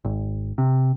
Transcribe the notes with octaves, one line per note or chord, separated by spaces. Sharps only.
G#1
C3